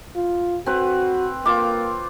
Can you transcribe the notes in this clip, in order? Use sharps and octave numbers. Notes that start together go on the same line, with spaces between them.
F4
C4 F#4 B4
A#3 F4 D6